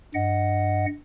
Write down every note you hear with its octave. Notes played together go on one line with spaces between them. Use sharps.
G2 D#5 F#5